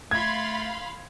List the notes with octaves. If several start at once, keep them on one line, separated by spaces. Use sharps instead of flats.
A3 F5 B5 C6 G#6